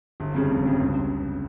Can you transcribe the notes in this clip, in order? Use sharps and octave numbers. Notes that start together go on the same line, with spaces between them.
G1
F2 C#3 G3
G1
F2 C#3 G3
C#2